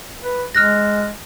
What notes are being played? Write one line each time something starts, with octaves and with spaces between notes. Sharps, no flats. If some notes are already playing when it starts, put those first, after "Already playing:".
B4
G#3 F6 F#6 A#6